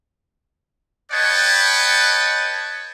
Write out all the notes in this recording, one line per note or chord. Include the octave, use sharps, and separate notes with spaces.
B4 C#5 D#5 F#5 G5 A5